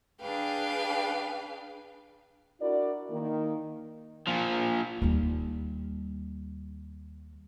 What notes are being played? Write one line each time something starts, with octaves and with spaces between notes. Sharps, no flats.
D4 G#4 B4 F5 G5
D4 E4 F#4 A#4 D5
D#3 A#3
A#2 F3
D#2 G3